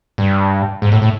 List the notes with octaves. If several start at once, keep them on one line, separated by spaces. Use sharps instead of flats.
G2
G#2
A2
A2